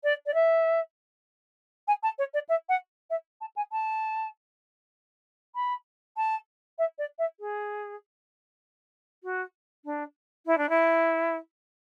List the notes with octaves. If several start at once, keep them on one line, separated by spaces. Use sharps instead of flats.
D5
D5
E5
G#5
A5
C#5
D5
E5
F#5
E5
A5
G#5
A5
B5
A5
E5
D5
E5
G#4
F#4
D4
E4
D4
E4